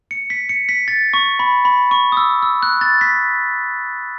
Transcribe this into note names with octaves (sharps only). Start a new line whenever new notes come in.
C#7
B6
C#7
B6
A6
C#6
B5
B5
C#6
D#6
E6
E6
F#6
A6
B6